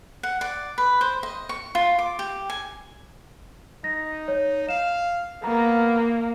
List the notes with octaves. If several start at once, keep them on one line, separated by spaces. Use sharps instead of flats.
F#5
D5
B4
C5
D#5
C#6
F4
D6
G4
G#5
D#4 A#6
C#5
F5 E7
A#3 B3 A#5